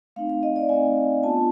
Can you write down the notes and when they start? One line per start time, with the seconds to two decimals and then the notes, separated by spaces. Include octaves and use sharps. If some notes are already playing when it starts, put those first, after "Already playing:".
0.16 A3 C4 D#4 F5
0.30 F5
0.43 D#5
0.56 D5
0.69 A3 C4 D#4 G#5
1.23 B3 D4 F4 A5